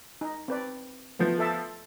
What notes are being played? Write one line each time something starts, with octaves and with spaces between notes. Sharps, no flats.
D#4
C4 B4 D5
F3 A3 B3
A4 E5 A5